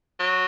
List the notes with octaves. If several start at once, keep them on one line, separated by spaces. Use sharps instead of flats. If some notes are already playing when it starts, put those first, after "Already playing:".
F#3